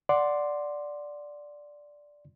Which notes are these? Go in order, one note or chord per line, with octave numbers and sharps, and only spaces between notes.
D5 F#5 C6